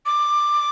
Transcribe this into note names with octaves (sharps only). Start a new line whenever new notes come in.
D6